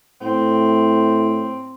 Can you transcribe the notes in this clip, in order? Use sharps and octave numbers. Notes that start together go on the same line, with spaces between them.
A2 C4